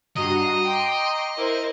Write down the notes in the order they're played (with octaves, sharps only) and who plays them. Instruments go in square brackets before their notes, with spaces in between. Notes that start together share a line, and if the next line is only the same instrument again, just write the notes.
[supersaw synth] G2 F#4 C7 [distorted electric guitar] D#5 [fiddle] A#5
[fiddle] G5 [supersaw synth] A#5 C6 D6
[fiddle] E4 [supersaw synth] A#4 C5 C6